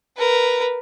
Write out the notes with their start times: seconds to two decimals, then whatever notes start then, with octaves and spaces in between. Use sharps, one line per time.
0.17 A#4 B4